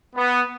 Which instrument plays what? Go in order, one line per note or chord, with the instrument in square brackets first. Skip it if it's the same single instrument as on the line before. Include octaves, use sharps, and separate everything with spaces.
[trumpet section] B3